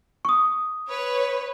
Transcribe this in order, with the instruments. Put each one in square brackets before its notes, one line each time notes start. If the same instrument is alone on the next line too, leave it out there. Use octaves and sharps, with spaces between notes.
[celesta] C#6 D#6
[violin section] B4 C#5